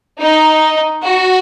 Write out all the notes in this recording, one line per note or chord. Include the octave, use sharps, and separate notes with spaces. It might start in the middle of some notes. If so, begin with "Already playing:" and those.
D#4
F#4